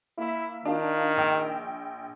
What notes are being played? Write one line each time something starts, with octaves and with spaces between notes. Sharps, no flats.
A#3 E4 E5
D#3 D4 F4
A#1 G5